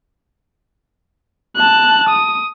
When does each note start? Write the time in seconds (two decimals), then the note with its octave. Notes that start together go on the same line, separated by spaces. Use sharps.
1.56 A5 F#6
2.09 D#6